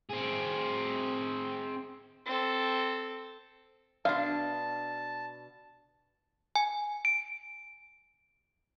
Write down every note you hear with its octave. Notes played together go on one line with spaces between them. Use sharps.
C4 G#4
C4 A4
B2 D4 F5 A5
G#5
D7